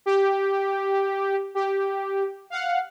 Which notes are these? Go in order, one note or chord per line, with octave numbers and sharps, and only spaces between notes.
G4
G4
F5 F#5